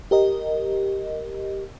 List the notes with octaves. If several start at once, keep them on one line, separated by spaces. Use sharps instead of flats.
G4 A#4 D#5